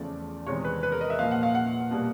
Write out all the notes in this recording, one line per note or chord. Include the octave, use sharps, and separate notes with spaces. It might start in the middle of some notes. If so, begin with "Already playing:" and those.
Already playing: E2 C#3 F3 A3 D5
E2 C3 D#3 G#3 C#5
B4
B4
A#4
D#5
E5
A#2 F3 A#3 F5
F#5
F5
F#5
B2 G3 A#3